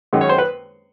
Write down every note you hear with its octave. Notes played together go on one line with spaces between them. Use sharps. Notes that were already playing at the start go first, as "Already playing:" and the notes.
F#2 D#3 G#3
C#5
C5
B4